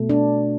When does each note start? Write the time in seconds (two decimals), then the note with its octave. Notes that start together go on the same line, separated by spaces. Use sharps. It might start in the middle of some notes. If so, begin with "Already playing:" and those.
Already playing: B2 A3
0.09 D4